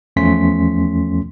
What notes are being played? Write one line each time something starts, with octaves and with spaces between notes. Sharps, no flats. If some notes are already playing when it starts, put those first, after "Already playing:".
E2 F3 A3 C#4 C6 B6